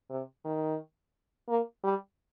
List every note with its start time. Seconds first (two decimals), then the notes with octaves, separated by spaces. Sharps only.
0.10 C3
0.45 D#3
1.49 A#3
1.84 G3